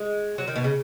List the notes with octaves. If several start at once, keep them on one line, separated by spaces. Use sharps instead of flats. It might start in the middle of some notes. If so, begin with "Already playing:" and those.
Already playing: G#3
F#3
D#3
B2
C#3